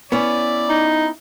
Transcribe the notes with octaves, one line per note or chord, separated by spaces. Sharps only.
B3 C#4 E4 D5
D#4